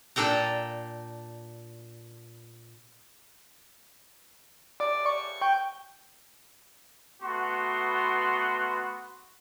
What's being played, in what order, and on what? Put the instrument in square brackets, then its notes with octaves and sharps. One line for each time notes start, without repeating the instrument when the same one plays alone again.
[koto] A#2 D4 A4 G5 A#5
[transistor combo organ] D5
C#6
G5
[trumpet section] A3 B3 F#4 B4 C6